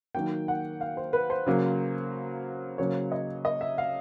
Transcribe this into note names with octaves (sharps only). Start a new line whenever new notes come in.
D#3 F#3 A#3 G5
F#5
F5
C5
B4
C5
C#3 F#3 A#3
C#3 F#3 A#3 C#5
D#5
D#5
E5
F5